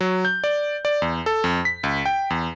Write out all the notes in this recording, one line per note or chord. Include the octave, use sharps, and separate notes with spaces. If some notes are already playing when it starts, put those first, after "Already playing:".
F#3
G6
D5
D5
E2
A4
F2
B6
C#2
G5
E2